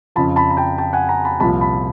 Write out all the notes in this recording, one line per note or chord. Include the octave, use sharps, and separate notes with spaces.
F2 C#3 F3 A5 B5
A5 B5
A#5
G5 A5
G5 A5
F#5 G#5
G#5 A#5
A5 B5
C2 A#2 F3 A5 B5
A5 B5